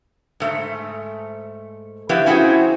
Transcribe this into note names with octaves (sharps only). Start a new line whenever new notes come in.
G#2 A3
F3 B3 E4 G4 B4 E5
C#4 E4 F#4 G#4 C5 G5